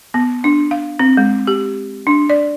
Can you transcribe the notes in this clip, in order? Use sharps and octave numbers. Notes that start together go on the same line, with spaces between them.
B3
D4
F5
C4
G#3
G4
D4
D5